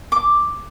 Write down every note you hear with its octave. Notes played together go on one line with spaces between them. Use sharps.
D6